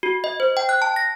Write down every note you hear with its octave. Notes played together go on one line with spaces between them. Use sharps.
F#4
D#5
C5
G5
F#6
A5
A#6